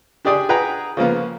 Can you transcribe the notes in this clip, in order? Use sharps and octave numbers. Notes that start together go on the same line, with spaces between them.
D4 G4 G#4 D5 G5 D#6
G#4 B4 F#5 G5 A#5
C#3 F3 A#3 B3